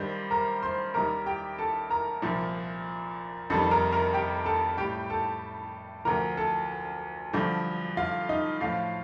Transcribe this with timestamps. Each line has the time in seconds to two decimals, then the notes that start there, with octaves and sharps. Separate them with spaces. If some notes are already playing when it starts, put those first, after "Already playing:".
Already playing: G2 D#3 G3 C5
0.31 A#4 A#5
0.62 C5 C6
0.94 D#2 D#3 G3 A#4 A#5
1.26 G4 G5
1.58 A4 A5
1.90 A#4 A#5
2.22 C2 A#2 F3
3.50 F2 D#3 G3 A4 A5
3.71 A#4 A#5
3.92 A#4 A#5
4.14 G4 G5
4.46 A4 A5
4.77 A2 G3 G4 G5
5.10 A4 A5
6.05 D2 D3 F3 A#4 A#5
6.37 A4 A5
7.33 G2 D3 F3
7.97 F4 F5
8.29 D#4 D#5
8.60 A2 F3 F4 F5